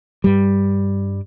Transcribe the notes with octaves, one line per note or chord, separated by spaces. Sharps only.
G2 G3